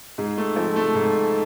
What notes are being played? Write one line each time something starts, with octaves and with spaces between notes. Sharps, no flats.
G#2 G#3
A3
F3 C4
A3
G#2